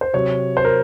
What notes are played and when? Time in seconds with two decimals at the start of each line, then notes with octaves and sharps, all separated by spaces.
0.01 C5
0.13 C3 F#3 C#5
0.57 C5
0.65 A#4